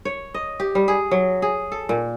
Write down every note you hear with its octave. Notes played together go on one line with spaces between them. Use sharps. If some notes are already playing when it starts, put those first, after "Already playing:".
C#5
D#5
G4
G3
G#4
F#3
G#4
A4
A#2